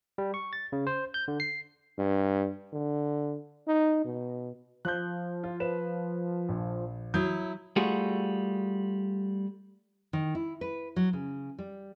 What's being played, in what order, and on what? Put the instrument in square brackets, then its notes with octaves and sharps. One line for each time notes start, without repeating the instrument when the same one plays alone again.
[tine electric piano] G3
C#6
A6
C#3
C5
G6
D3
C7
[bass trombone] G2
D3
D#4
B2
[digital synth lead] F3 [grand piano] F#6 G6
[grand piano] F4
B4 C5 E7
A#1
[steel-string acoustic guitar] F#3 E4 [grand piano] D#6 G6
[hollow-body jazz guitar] G3 A3 F4 F#4 G#4
[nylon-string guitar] D#3
E4
B4
F#3
C#3
G3